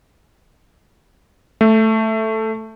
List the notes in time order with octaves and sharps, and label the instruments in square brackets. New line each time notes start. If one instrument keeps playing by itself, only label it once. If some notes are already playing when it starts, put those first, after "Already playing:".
[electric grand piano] A3